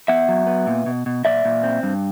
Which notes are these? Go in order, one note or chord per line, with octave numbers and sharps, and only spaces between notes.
B3 E5 F#5
F#3
B3
A#2
B2
B2
A#2 D5 E5
A#2
C4
G2